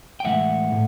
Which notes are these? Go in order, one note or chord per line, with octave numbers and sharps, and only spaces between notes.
G5
A2 E3 G#3 E5 F#5
A2